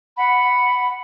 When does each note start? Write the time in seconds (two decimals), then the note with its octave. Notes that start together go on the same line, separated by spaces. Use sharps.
0.17 F#5 B5